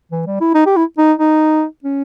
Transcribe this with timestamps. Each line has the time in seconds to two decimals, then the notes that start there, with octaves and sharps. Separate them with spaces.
0.12 E3
0.26 G3
0.41 E4
0.55 D#4
0.66 G4
0.77 E4
0.98 D#4
1.19 D#4
1.84 C#4